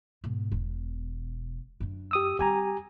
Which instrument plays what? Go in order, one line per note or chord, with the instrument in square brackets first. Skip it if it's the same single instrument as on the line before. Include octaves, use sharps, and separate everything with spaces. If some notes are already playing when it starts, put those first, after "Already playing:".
[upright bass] G#2 B2
E1 B2
F#2 D4
[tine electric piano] G4 D#6 E6
[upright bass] G3 C4 [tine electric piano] G4 G#5 A#5